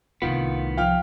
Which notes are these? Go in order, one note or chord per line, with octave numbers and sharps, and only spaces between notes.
C2 A2 C3 D#3 B3 F4
F3 F5 G5 F6